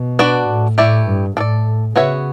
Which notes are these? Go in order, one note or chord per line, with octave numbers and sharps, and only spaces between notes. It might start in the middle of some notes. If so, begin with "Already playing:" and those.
Already playing: B2
D4 F#4 B4 D5
A2
A2 A3 E4 G4 D5
G2
A2 D4 A4 D5
C#3 B3 F#4 C#5 E5